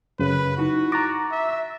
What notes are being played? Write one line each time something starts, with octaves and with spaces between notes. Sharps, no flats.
F#2 C#3 B4
D#4 E4 F#4
A#5 C#6 D6 F#6 A6 A#6
E5